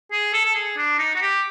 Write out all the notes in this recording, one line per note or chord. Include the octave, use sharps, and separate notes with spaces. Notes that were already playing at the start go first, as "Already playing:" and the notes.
G#4
A4
A4
G#4
D4
D#4
F#4
G4